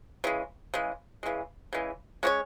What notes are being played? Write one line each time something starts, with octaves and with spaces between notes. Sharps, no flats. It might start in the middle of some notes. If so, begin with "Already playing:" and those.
C#3 E3 G#3
C#3 E3 G#3
C#3 E3 G#3
C#3 E3 G#3
G#3 C#4 F#4 C#5